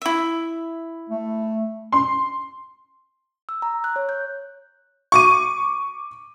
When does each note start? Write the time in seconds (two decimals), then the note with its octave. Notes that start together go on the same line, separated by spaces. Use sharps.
0.02 E4 E5
1.10 A3
1.92 C6
3.49 E6
3.62 A#5
3.84 F#6
3.96 C#5
4.09 G6
5.12 C#6 D6 D#7